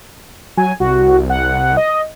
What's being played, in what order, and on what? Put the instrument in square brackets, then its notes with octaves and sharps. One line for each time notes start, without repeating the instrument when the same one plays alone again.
[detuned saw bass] F#3 [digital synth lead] G#5
[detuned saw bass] C2 [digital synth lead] F#4
[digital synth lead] F#5
D#5